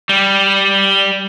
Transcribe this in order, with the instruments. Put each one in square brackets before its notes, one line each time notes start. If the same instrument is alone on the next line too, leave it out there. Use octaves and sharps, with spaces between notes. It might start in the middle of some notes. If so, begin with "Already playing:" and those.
[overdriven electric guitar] G3